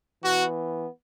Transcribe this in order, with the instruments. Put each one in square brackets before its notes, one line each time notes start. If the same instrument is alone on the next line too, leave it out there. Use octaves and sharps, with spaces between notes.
[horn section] E3 B3 F#4